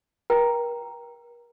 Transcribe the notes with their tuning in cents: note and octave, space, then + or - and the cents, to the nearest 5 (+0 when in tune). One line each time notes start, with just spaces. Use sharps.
A#4 +40 G5 +0 A#5 +0